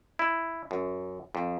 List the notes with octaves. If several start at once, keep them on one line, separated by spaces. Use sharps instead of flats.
E4
F#2
F2